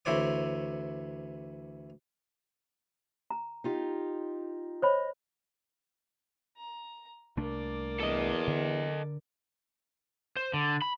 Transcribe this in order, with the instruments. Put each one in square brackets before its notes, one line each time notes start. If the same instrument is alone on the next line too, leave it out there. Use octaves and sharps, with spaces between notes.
[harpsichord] D2 E3 E4 C5 C#5 D6
[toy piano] A#5
[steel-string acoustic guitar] D#4 F4 G4
[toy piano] C5 C#5 B5 [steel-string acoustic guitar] D#5
[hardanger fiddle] A#5
[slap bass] C2 A3 D4 [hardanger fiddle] A#3 D5
[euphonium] E2 [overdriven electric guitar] A4 D#5
[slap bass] D3
[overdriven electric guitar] C5
D3
B5